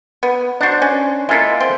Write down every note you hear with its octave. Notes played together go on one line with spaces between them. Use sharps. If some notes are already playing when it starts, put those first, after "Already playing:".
B3
D4 F#4 C5 F#5
C#4
G#3 A#3 E4 F4 A4
C4